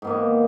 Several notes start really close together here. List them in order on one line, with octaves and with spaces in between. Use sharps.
G#2 B3 A#3 D#3